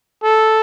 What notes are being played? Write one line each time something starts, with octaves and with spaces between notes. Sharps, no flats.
A4